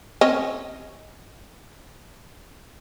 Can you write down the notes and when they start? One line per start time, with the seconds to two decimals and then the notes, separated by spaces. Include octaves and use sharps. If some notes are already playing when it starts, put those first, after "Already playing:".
0.21 C4 C#4 D#5